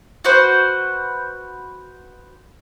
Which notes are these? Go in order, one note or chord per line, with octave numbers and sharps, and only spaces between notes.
F#4 B4 C5